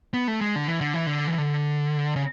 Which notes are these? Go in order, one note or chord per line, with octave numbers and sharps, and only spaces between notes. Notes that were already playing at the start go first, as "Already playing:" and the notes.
B3
A3
G#3
D3
E3
D3
E3
D3
E3
D3
C#3